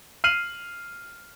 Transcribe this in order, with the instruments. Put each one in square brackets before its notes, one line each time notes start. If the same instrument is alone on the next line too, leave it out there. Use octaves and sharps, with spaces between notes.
[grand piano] F6 C7 D#7 F#7